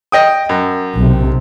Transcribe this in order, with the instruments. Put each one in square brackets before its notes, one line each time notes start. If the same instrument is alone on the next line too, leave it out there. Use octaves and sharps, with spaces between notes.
[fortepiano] D#5 G5 D#6
F#2
[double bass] B1 C3